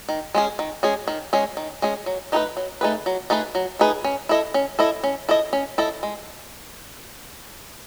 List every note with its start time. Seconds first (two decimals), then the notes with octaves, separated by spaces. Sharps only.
0.09 D#3
0.34 G#3 C#4 G#4
0.59 D#3
0.83 G#3 C#4 G#4
1.08 D#3
1.33 G#3 C#4 G#4
1.57 D#3
1.82 G#3 C#4 G#4
2.06 F#3
2.32 A3 D#4 G#4 B4
2.57 F#3
2.81 A3 D#4 G#4 B4
3.06 F#3
3.30 A3 D#4 G#4 B4
3.55 F#3
3.79 A3 D#4 G#4 B4
4.04 C#4
4.29 E4 A4 D#5
4.54 C#4
4.79 E4 A4 D#5
5.03 C#4
5.29 E4 A4 D#5
5.53 C#4
5.78 E4 A4 D#5
6.03 G#3